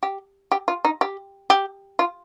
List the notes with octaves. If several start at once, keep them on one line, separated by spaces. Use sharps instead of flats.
G4
G4
F4
D#4
G4
G4
F4